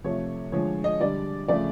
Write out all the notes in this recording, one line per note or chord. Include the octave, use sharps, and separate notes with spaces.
C3 F3 A3 C#5
D3 F3 G#3 C#5
D#5
D3 G3 D5
C#3 F3 A3 D5